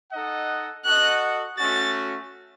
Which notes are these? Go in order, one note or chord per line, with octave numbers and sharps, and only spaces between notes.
D#4 A4 D#5 F#5
F#4 A4 D#5 F#5 F#6
A3 C#4 F#4 A6